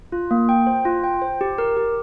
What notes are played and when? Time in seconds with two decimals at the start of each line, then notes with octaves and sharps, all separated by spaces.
0.12 F4
0.31 A#3
0.49 G5
0.67 C5
0.85 F4
1.04 G5
1.22 C5
1.41 G4
1.58 A#4
1.76 G4